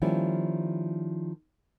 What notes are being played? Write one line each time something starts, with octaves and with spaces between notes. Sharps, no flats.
D#3 F3 G3 A#3 C#4 E4